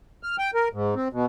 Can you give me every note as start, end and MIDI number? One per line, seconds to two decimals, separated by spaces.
0.23 0.36 89
0.39 0.51 79
0.54 0.68 70
0.73 0.95 44
0.96 1.08 60
1.13 1.26 47